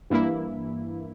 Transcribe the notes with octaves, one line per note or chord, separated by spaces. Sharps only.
G2 E3 A#3 E4